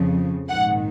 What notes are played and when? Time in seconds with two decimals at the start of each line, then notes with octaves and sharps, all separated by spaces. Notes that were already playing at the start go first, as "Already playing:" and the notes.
Already playing: F2 C#3 F3
0.49 A#1 G#2 D#3 F#5